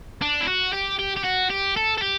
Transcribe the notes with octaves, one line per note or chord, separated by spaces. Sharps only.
D4
E4
F#4
G4
G4
G4
F#4
G4
A4
A4
G4